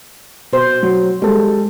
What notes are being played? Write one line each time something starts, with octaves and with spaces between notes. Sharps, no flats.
B2 C5
F#3
G3 G#3 A4